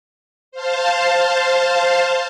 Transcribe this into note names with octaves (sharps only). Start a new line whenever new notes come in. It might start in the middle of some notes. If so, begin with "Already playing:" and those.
C5 F5 A5